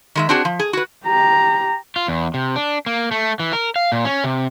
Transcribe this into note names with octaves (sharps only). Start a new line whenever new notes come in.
D#3 G#3 E5
C4 D4 F#4 G#4
F3
G#4
F#4 B4
G4 A#5
F4
E2
C3
D4
A#3
A3
E3
A#4
F5
A#2
C#4
C3